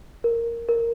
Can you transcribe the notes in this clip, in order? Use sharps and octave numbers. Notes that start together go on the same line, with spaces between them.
A#4
A#4